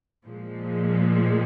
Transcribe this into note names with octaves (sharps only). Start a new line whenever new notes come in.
A#2 F3 G#3